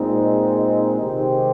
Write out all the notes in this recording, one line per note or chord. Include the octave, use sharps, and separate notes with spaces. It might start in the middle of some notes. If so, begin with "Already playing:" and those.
Already playing: A#2 G#3 C4 D#4
C3 D#3 G#3 C4 G4